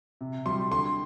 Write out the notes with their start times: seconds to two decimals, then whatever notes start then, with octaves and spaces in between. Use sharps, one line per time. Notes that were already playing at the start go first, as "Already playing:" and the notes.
0.21 C3
0.46 G3 C6
0.71 D3 C6